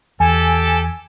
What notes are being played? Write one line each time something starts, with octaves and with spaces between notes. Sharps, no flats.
E2 G4 A4 G#5